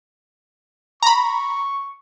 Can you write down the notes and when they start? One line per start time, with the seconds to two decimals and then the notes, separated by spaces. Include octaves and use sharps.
1.02 A#5 B5 C#6